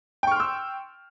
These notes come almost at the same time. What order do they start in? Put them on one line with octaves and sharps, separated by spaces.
G5 C#6 F6 C6 E6